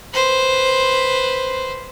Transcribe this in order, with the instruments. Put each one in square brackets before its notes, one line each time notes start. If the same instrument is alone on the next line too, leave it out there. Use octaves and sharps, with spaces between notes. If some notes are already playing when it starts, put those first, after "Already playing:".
[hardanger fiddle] B4 C5